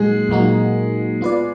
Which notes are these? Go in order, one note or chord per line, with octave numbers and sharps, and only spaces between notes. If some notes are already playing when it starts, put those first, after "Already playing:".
Already playing: A#2 F#3 G#3 A#3 D#4 F#4 G#4
A#2 F#3 A#3 D#4 F#4
B3 F4 B4 D5